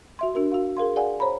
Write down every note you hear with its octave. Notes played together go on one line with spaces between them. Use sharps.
F#4 E5 C6
D4 F#4 A#4
F#4 F5
G#4 A#4 F5 C6
G#4 D5 F5 F#5 G#5
C5 C#5 A#5 B5